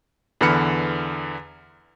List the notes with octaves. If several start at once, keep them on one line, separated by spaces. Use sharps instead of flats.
E2 D3 E3 B5 F6 C#7